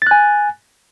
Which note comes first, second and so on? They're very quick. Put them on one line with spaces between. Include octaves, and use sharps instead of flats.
A6 F#6 G#5